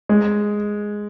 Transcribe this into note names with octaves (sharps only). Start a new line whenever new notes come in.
G#3